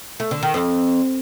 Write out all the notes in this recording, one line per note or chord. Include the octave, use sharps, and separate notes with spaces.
A3
D3
D#3
F2